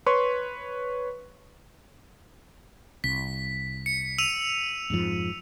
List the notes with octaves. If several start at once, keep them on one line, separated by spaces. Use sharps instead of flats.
B4 C#5 C6 C#6
C2 B6
C#7
E6 D#7 F7
F2 G#2 F3